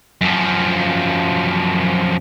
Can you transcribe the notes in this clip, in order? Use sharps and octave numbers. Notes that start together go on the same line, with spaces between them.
F#2 F3